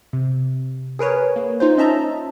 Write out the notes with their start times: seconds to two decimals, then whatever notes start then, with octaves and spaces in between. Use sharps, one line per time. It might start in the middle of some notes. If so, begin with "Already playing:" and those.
0.13 C3
0.99 G#4 A#4 B4 C#5
1.36 A#3
1.60 D#4 F4 C5
1.78 C#4 D#5 E5 A5 A#5